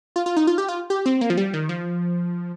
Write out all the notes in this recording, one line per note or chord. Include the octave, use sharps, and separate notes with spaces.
F4
F4
D#4
F4
G4
F4
G4
C4
A#3
F3
G3
D#3
F3